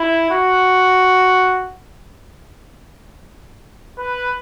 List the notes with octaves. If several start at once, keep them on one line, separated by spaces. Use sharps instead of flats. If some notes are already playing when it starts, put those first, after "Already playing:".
Already playing: E4
F#4
B4